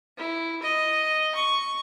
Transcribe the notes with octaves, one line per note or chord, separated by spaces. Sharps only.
E4
D#5
C#6